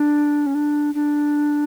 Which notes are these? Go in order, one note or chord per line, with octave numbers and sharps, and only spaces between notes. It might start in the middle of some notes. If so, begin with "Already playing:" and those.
Already playing: D4
C#4
D4
D4